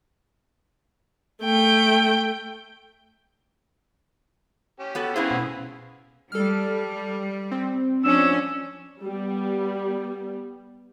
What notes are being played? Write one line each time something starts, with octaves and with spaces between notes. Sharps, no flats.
A3 G5
C#4 G4
B3 F#4 A4
B3 C#4 E4 G#4 B4 C5 F5
B2
G3 A4 F6
C4
F3 C#4 D4 E6
G3 B3